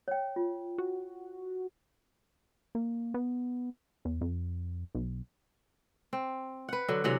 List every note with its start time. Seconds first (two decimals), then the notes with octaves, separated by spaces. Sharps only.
0.08 C#5 G5
0.36 F4
0.78 F#4
2.75 A#3
3.14 B3
4.05 E2
4.21 F2
4.95 B1
6.13 C4
6.69 B4 F#5
6.88 D3 F#3
7.04 C3 E3 F#3 F#5